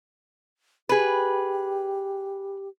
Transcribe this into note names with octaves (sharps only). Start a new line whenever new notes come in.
G4 G#4 B4